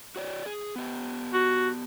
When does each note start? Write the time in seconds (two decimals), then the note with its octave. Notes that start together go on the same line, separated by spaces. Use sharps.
0.16 F#4 C#5 D5
0.46 G#4
0.76 B3 G4
1.33 F#4